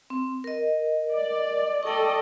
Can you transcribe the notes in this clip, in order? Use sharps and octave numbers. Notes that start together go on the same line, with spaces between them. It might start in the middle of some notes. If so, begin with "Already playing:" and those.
C4
A#4 D#5
D5
A4 D5 D#5 G5 C#6